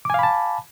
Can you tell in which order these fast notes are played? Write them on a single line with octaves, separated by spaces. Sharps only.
D6 G#5 F5 B5 A5